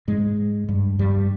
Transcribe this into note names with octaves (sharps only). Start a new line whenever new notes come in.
G#2 G#3
G2 G3
G2 G3